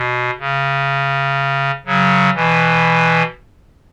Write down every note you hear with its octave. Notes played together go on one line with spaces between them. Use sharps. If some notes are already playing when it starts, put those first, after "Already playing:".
Already playing: B2
C#3
C#3 F#3
B2 E3